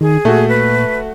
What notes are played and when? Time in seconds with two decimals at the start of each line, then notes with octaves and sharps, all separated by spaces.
0.01 D#3 G#4
0.25 A#2 A3 F#4
0.49 B4